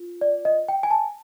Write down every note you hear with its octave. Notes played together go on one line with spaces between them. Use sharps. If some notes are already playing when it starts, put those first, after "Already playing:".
Already playing: F4
D5
D#5
G5
G#5
A5